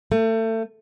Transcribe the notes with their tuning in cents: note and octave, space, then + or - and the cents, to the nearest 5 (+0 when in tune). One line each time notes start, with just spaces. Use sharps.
A3 +30